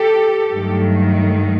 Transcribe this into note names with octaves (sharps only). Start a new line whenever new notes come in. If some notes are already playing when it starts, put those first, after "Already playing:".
Already playing: G4 A4
G2 D#3 F#3 A3